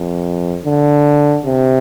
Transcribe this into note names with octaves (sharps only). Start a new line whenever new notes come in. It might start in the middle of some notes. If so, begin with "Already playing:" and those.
Already playing: F2
D3
C3